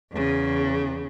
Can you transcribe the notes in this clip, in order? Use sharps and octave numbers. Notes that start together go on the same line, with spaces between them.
E2 C#3